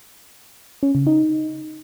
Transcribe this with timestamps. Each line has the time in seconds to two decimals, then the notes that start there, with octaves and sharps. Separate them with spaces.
0.83 C#4
0.95 C#3
1.07 D#4